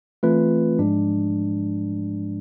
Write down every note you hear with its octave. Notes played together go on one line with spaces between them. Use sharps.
E3 A3 C4 F4 B4
G#2 F3 G#3 D4